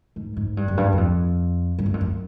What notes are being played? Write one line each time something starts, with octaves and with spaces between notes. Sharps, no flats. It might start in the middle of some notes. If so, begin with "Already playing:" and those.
G#2
G#2
G2
F#2
G2
F#2
F2
G2
F#2
F2
F#2